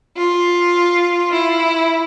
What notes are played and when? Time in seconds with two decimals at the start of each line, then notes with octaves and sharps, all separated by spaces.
0.17 F4
1.31 E4